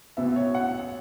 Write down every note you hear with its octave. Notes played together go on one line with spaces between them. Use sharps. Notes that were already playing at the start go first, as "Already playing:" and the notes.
B1 B2 B3 E5
C#5
F#5